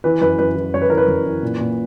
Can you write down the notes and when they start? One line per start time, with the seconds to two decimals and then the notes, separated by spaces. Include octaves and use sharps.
0.04 E3 B4
0.21 F#2 B4
0.39 F#2 B4
0.56 E3
0.74 F#2 C#5
0.82 B4
0.90 E3 A#4
0.97 B4
1.08 F#2
1.25 E3
1.43 A#2
1.60 A#2